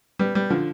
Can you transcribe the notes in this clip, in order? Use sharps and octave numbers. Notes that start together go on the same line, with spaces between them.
G3 B3
G3 B3
D3 F3